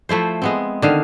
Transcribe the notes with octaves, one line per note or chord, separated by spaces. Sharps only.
F3 A3 E4 C5
G#3 B3 C4
D3 D#3 F5